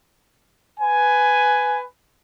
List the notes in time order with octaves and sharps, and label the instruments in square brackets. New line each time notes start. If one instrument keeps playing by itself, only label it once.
[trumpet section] B4 G#5